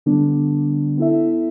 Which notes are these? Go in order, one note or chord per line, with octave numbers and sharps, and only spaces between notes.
D3 G3 B3 D4
B3 E4 A4 E5